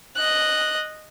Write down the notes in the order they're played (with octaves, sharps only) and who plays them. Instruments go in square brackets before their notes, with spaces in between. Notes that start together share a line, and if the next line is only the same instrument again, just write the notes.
[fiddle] D#5 F#6